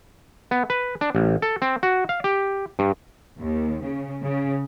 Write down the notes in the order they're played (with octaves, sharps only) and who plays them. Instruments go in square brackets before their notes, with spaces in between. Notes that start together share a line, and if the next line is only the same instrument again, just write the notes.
[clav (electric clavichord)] B3
B4
D4
A1
A4
C4
F#4
F5
G4
G2
[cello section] D#2
C#3
C#3